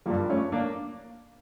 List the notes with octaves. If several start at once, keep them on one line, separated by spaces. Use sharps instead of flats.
G2 F3 G3 A#3
A3 C#4
A#3 D4